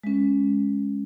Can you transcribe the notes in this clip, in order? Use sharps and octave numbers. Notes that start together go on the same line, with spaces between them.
G#3 C#4